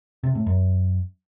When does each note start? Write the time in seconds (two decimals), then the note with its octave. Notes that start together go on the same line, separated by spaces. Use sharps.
0.23 C3
0.35 A2
0.46 F#2